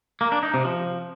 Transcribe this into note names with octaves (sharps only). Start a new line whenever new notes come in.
A#3
D4
D#4
C3
F3